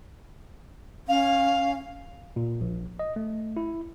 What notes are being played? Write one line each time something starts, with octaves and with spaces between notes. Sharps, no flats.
C#4 F5
A#2
A#1
D#5
A3
E4